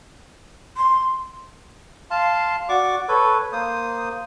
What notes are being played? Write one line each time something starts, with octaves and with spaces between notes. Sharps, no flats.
C6
F5 A5 C6
F#4 D5 C#6 D6
A4 B4 C#5
A#3 C5 D#6